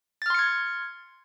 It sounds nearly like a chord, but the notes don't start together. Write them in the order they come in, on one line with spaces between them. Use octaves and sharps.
A6 F6 C6 C#7 G#6